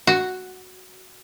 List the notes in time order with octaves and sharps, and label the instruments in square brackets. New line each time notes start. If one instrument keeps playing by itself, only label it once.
[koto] F#4